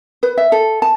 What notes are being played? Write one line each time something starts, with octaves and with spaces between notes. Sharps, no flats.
B4
E5
A4
A5